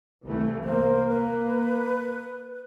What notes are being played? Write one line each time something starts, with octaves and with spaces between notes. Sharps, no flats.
C2 E3 A3
A#3 C5
B4